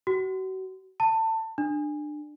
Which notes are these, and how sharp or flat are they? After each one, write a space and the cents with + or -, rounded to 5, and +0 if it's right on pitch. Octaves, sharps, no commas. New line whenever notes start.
F#4 +35
A5 +25
D4 +25